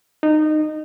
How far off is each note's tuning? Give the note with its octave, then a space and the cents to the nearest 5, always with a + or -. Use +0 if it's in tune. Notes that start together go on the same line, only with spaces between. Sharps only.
D#4 -20